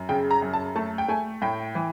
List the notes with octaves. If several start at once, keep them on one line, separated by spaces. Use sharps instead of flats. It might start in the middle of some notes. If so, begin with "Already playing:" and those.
Already playing: F#2
C#3 G5
A#5
F#2
A5
A3 A5
G5
A3 G#5
A2 G5
E3